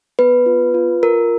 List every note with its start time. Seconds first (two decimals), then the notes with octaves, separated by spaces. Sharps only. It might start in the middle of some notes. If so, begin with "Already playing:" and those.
0.19 B3 B4
0.46 F4
0.74 F4
1.03 F4 A#4